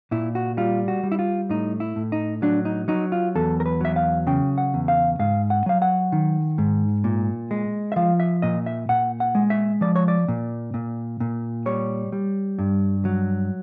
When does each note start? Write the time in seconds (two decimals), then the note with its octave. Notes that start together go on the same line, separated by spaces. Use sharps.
0.11 A#2 E4
0.35 F#4
0.57 G3 F4
0.88 F#4
1.03 G3
1.12 E4
1.19 F4
1.49 A2 D#4
1.80 E4
1.96 A2
2.12 D#4
2.42 F#3 D4
2.65 D#4
2.88 F#3 D#4
3.12 F4
3.35 E2 A4
3.60 A#4
3.66 B4
3.81 F#3 E5
3.96 F5
4.27 C#3 G5
4.58 F#5
4.74 E2
4.88 F5
5.19 G#2 F5
5.50 F#5
5.66 F#3 F5
5.82 F#5
6.12 D#3
6.58 G#2
7.04 A#2
7.51 G#3
7.92 E5
7.96 F3 F5
8.20 E5
8.42 A#2 D#5
8.66 E5
8.89 A#2 F#5
9.20 F#5
9.35 G#3
9.50 E5
9.81 F3 D5
9.96 C#5
10.08 D5
10.28 A#2
10.74 A#2
11.20 A#2
11.66 G3 C#5
12.12 G3
12.59 G2
13.05 F#3